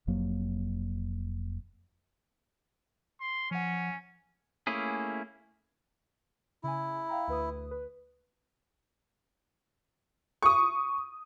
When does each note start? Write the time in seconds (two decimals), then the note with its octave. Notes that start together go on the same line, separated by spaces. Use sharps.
0.07 F1 F2 F#3 A#3
3.20 C6
3.51 F3 C#4 F#5
4.67 A3 A#3 C#4 E4 G#4
6.64 C#3 E4 G#5
7.09 F5 G5 A#5
7.28 D2 B4 D#6
7.71 B4
10.43 C#6 D#6